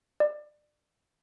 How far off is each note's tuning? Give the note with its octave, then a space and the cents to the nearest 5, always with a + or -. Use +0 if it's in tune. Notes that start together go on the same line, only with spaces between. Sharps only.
D5 +25